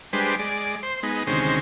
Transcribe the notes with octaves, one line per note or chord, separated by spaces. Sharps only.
G3 G#3 D4 B4 C5
G#3 D5
C5
G#3 B3 D#4
D2 C3 D#3 G#3 C#4 C5